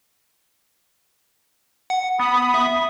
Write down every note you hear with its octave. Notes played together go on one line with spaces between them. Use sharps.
F#5
B3 B5 D#6
E5